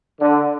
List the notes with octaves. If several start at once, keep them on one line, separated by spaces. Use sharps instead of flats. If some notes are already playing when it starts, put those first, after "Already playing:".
D3